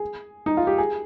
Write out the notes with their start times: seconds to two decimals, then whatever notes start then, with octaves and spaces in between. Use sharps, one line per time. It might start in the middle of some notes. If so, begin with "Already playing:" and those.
Already playing: G#4
0.46 D#4
0.57 F4
0.67 G4
0.78 G#4